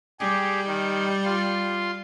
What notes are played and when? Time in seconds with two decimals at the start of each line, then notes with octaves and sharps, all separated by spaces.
0.20 G3 G4 G#4
0.67 D#3
1.25 F4 C6